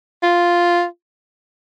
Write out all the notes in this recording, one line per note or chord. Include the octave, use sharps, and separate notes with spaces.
F4